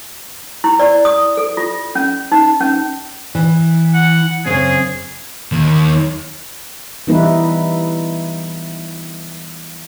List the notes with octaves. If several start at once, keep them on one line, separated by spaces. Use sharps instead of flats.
E4
D5
D#6
A4
F4
C#4
D#4
C#4
E3
F#5
F#2 C#3 C4 G#4
D#2
E3 G3 B3 D#4 E4 B4